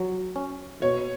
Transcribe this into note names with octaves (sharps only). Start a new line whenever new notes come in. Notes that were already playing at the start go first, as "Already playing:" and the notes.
Already playing: F#3
C#4
B2 C#5